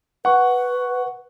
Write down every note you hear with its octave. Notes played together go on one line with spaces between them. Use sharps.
B4 F#5 C#6